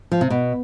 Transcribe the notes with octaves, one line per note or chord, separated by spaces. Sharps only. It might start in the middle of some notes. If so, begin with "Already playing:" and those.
F3
C3
B2